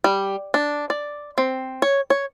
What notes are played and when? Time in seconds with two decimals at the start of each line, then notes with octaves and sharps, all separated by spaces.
0.04 G3
0.54 D4
0.90 D5
1.38 C4
1.82 C#5
2.10 C#5